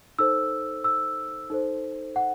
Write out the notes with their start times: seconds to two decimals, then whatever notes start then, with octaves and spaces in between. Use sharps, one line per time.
0.19 D#4 A4 C5 E6
0.84 E6
1.50 D#4 A4 C5
2.16 F#5